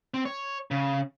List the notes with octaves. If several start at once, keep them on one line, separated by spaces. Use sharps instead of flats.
C4
C#5
C#3